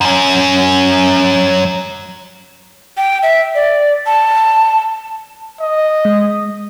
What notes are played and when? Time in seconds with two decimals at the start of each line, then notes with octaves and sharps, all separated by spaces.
0.01 F#2 C#4
2.97 G5
3.23 E5
3.55 D5
4.06 A5
5.61 D#5
6.05 G#3